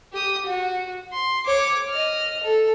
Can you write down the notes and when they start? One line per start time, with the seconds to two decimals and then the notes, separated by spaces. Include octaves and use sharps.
0.12 G4 D#6
0.46 F#4
1.13 C6
1.46 C#5 D6
1.89 D#5 F6
2.43 A4